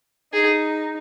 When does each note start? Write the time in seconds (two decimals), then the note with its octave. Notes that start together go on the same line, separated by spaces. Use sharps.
0.33 D#4 G#4